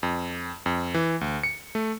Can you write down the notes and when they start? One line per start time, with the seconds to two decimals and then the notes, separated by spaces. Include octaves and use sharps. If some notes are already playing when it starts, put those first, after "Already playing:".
0.03 F2
0.66 F2
0.94 E3
1.21 D2
1.44 C#7
1.75 A3